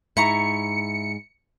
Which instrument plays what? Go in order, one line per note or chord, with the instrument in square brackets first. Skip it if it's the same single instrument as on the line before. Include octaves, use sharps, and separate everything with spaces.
[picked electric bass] G#2 [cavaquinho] E4 A#5 C#6 [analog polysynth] C#7